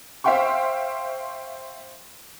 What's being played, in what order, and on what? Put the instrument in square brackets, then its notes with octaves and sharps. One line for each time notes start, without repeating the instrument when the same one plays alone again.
[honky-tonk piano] C5 E5 F5 G5 C6 C#6